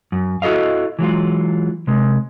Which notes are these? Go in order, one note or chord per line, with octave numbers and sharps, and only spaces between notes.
F#2
E4 F#4 A4 D#5 F5
E3 F#3 G#3 F4
C3 G#3